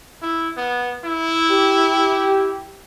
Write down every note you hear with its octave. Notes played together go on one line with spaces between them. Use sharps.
E4
B3
E4
G4